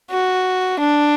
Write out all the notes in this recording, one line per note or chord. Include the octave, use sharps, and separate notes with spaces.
F#4
D4